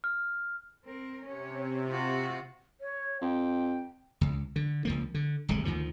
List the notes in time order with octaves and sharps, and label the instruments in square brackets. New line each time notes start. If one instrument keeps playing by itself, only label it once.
[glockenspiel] F6
[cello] C4 A#4
[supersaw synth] C3 [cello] C#4 C#5
[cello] F4 F#4
[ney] C#5
[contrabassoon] F2 [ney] G5
[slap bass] C#2
D3
C#2 F3 A#3
D3
D1 G#1 C3 G#3
D2 D#3 F3